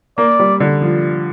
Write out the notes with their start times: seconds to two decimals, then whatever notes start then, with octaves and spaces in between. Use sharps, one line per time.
0.18 A#3 D5
0.39 G3
0.60 D3
0.82 F3